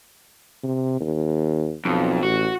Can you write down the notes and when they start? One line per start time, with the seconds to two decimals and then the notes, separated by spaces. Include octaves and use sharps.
0.63 C3
1.00 D#2
1.85 B1 F2
2.23 A1 F#4